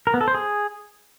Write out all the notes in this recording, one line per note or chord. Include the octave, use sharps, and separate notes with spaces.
A#4
B3
A4
C5
G#4